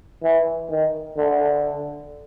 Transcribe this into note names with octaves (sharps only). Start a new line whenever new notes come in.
E3
D#3
D3